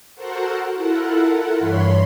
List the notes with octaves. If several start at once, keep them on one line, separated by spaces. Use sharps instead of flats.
F#4 A4 A#4 C5 F#5
E4 F4 A4 A#4 F#5
G2 E3 C#5 B5 C6